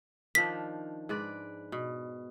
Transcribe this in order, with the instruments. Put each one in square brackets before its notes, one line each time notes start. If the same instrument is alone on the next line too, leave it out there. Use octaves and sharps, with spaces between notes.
[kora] D#3 F3 D4 [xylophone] B6
[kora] G#2 B4 D5
B2